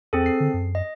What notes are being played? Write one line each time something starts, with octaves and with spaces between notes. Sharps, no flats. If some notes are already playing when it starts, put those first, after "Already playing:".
E2 C4 G#4 A4
C7
D3
F#2
D#5